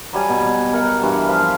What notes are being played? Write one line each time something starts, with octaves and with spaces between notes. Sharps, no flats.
F#3 G3 G#5 A5
B2
A#4 F#5
G2 E3 F#4
F3 F5 B5